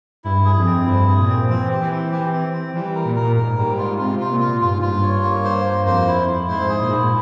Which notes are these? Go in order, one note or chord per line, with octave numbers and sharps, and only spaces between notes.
G2 E4
G#4
F2
C4
G2 E4
G#4
A#2
C4
E3 C4
G4
E3
C4
E3 G4
C4
C4
E3 G3
A#4
A#2
A#4
A#2
G#2 A#4
G#2 G3
G#2 F4
C3 F4
F4
A#2
F4
G2 F4
G#2
G2 F4
C#5
A#3
C5
A#3
F2 C5
E4
F2
E4
G#2 C5
G#4
A#2
G#2 E4
A#2